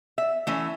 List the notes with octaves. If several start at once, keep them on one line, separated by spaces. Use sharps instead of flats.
E5
E3 A3 C#4 E5